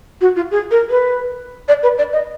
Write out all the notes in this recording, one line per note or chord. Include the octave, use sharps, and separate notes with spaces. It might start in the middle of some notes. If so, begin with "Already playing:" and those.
F#4
F4
G#4
A#4
B4
D5
B4
D5
D#5